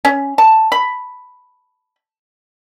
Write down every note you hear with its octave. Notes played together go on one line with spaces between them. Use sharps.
C#4
A5
B5